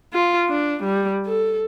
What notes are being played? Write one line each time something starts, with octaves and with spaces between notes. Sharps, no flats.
F4
D4
G3
A4